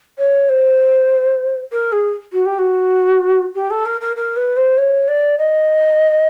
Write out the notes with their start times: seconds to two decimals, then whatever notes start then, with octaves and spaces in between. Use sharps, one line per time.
0.18 C#5
0.49 C5
1.72 A#4
1.92 G#4
2.32 F#4
2.45 G4
2.58 F#4
3.54 G4
3.70 A4
3.85 A#4
4.00 A#4
4.16 A#4
4.36 B4
4.56 C5
4.77 C#5
5.07 D5
5.38 D#5